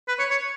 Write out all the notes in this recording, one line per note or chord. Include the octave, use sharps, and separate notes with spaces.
B4
C#5
C#5